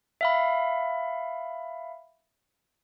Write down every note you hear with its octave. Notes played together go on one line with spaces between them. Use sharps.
E5 F5 B5